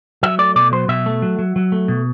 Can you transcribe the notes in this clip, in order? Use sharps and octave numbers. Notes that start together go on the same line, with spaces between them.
F#3 E5
A3 D5
B2 D5
F#3 C5
B2 E5
A3
F#3
F#3
F#3
A3
B2